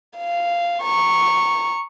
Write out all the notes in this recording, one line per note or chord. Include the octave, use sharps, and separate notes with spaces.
F5
A#5 C#6